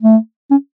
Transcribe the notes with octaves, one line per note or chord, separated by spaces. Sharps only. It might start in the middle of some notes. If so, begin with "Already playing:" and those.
A3
C#4